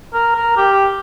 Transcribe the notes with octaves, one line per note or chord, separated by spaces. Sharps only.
A#4
A#4
G4